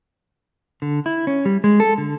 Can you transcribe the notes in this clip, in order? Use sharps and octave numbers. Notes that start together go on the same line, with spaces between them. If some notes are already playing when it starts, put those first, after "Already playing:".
D3
E4
C#4
G3
G#3
A4
D3